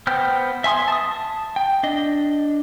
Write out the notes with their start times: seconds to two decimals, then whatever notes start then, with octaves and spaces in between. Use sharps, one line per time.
0.07 B3 C5 G5 F6
0.64 E5 G#5 C6 D#6
0.88 A5 D#6
1.56 G5
1.83 D4 D#5